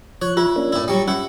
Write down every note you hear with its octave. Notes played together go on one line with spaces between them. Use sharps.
F3 C#5 F#6
E4 F4
A#3 C#4 D4
A2 E4
F#3 G3 C#6
C#4 E4